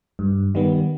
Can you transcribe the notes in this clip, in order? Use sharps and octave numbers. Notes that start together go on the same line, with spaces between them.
G2
D#3 G3 B3